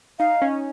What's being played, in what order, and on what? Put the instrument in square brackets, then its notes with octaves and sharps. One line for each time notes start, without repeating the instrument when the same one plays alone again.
[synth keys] D#4 [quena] F5
[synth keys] C#4